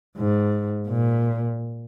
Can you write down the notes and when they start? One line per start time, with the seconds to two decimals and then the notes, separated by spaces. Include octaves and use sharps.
0.18 G#2
0.88 A#2